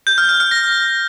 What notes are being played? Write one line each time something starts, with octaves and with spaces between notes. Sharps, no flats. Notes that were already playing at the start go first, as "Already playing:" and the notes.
G6
F6
F6
F6
A#6